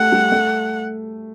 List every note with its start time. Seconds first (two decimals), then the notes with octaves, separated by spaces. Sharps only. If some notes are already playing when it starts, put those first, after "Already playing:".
Already playing: A3 G4 F#5
0.12 G3
0.32 A3